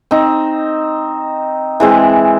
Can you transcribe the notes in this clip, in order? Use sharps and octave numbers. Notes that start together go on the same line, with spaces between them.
C4 D#4
E3 G#3 C4